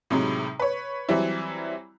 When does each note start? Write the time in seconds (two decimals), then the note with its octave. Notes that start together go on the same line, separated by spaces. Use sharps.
0.10 A2 C3 F#3 G#3 D#4
0.60 B4 C#5
1.09 E3 F#3 G3 C4 E4